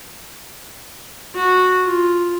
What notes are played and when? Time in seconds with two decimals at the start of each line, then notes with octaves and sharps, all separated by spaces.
1.36 F#4
1.85 F4